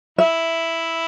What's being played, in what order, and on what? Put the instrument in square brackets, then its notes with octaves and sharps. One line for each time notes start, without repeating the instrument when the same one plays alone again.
[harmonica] E4 [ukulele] E5